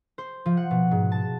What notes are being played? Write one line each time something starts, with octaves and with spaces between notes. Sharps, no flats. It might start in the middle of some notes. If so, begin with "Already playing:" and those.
C5
F3
F#5
B2
G#2
A5